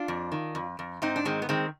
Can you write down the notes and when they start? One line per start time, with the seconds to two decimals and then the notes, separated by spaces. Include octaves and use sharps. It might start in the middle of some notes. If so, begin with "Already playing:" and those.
Already playing: D4 F4
0.08 F2
0.32 D#3
0.55 F2
0.79 F2
1.02 G#2 C4 D#4
1.16 D4
1.25 D#3 G#3 C4
1.42 B3
1.49 D#3 G#3 C4